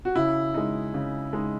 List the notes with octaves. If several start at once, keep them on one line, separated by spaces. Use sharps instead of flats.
F#4
C#3 E4
G#3 D#4
C#3
G#3 D#4